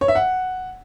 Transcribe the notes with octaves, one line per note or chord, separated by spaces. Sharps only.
C#5
E5
F#5